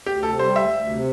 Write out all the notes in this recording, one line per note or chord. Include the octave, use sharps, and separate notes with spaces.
D2 G4
C3 A4
G3 C5
D2 E5
D2
C3